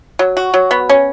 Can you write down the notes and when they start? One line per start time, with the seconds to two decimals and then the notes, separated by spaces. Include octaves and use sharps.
0.19 F#3
0.37 F#4
0.54 F#3
0.71 B3
0.89 C#4